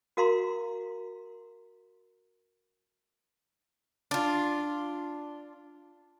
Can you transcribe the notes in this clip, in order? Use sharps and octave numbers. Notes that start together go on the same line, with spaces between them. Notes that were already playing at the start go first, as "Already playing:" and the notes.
F#4 A#4 F5 A#5 C6
D4 F4